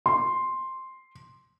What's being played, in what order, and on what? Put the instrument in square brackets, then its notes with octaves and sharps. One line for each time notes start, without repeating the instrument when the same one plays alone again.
[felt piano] C6